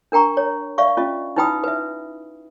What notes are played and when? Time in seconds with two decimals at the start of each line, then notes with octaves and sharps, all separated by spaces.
0.12 D4 A#4 G5 A#5 C#6
0.37 C#5
0.78 D5 E5 F5 C#6
0.97 C#4 F4 D#5
1.36 D#4 E4 B4 G5 B5 D#6
1.64 B4 E5